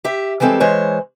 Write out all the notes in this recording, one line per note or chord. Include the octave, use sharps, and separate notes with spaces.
G4 E5
E3 G3 G#3 C4 A4
E3 G#3 C5 C#5